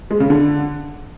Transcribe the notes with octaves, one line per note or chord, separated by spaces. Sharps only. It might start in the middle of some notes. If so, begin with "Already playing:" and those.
G#3
C#3
D3